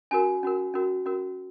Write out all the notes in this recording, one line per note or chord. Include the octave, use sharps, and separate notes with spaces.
C#4 F#4 A#4 G#5
C#4 F#4 A#4
C#4 F#4 A#4
C#4 F#4 A#4